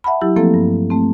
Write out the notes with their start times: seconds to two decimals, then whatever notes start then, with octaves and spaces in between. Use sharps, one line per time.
0.04 E5 F#5 A5 B5
0.21 F#3 E4 G4
0.36 F3 A3 A#3 C4 A4
0.54 G2
0.90 A3 C4